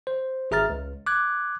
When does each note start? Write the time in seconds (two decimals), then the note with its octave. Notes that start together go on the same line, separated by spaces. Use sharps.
0.07 C5
0.51 G#1 G#4 E5 A#5 F6 A6
0.70 C#2
1.06 D6 F#6 G#6